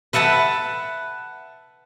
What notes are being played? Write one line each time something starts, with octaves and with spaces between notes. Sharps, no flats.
B4 E5 F#5 A5 B5